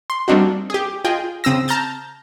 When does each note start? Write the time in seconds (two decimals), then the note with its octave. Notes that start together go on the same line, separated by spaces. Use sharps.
0.10 C6
0.28 G3 A#3 C4 D4 D#4 F#4
0.70 G4 G#4
1.04 F4 G#4 D#5 G5
1.44 C#3 C4 D#6 E6 A#6
1.68 A5 A#5 F6 G6 A6